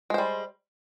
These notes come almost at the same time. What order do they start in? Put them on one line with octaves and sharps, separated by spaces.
G#3 C5 G3